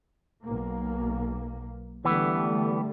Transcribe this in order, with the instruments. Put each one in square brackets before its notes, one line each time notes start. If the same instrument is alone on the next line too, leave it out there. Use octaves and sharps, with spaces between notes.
[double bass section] B1 A#3
[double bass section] D3 G3 A3 [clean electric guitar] E3 B3